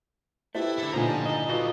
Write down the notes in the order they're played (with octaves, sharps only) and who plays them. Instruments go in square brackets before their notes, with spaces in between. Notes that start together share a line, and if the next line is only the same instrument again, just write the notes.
[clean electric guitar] A3 [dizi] E4 [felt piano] G4 B4 C5
[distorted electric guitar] D4 A4
[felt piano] A#2 D3 D#3 [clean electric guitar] F3 B3 [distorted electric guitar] G#5 A#5
[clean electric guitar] G3 [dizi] A5
[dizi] E4 [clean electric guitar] D#5
[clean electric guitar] F4 D#5 [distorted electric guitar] F#4 A4 [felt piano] B4